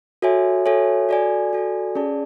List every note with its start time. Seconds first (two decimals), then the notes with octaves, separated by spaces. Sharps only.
0.22 F#4 A4 C#5 E5 G#5
0.66 F#4 A4 C#5 E5 G#5
1.09 F#4 A4 D5 G#5
1.53 F#4 A4 D5 G#5
1.95 C#4 G#4 D5 A5